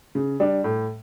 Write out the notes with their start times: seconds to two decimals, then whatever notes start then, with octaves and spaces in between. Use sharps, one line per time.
0.15 C#3
0.40 G3 D4
0.64 A2